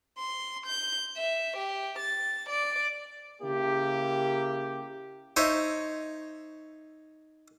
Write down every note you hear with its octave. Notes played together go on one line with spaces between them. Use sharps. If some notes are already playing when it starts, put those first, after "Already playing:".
C6
G6
E5
G4
A6
D5
C#3 A#3 E4 G4
D#4 C5 C#5 E5